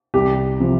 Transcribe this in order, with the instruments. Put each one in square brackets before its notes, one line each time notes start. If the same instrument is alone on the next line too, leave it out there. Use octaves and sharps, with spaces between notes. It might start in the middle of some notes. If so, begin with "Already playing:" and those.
[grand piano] C2 G4
C3 F3